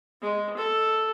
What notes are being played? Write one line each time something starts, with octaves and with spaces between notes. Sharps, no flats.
G#3
A4